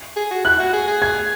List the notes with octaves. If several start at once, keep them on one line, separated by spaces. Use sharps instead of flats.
G#4
F#4
E4 F#6
F#4
G#4
G#4
G#6